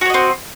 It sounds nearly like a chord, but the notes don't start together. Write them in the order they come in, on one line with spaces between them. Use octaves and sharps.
F#4 C#5 D#5 C4